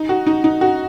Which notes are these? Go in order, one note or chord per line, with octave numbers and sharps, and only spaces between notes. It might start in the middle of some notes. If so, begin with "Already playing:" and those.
Already playing: D#4
F#4
D#4
D#4
F#4